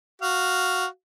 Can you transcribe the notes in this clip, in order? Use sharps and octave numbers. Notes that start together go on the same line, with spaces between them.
F#4 F5